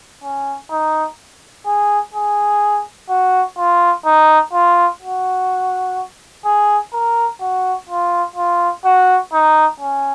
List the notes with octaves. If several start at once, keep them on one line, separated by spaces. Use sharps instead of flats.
C#4
D#4
G#4
G#4
F#4
F4
D#4
F4
F#4
G#4
A#4
F#4
F4
F4
F#4
D#4
C#4